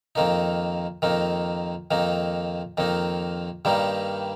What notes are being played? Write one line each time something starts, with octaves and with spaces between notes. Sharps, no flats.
F2 D#3 A#3 D#4
F2 D#3 A#3 D#4
F2 D#3 A#3 D#4
F2 D#3 A#3 D#4
G2 D#3 G3 A#3 D#4